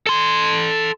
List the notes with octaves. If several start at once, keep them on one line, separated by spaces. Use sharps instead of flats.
A4 C6